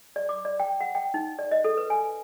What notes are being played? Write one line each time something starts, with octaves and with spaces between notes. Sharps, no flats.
D5
D6
D5
G5
F#5
G5
D#4
D5
D#5
A4
B4
G#5